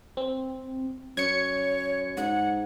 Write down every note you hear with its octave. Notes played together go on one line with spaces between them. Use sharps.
C4
F#2 C#5 G#6 C#7
G#2 F#5